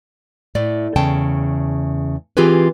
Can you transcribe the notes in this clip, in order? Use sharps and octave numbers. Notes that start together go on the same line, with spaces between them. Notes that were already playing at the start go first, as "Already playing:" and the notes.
A2 A3 D5
E2 C#3 A3 G5 A5
E3 C4 F4 G4 G#4 B4